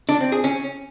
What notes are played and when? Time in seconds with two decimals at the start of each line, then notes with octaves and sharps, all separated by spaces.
0.09 D4
0.20 C4
0.32 G#4
0.44 C#4